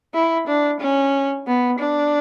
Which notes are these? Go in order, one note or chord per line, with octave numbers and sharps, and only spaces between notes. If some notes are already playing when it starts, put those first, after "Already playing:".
E4
D4
C#4
B3
D4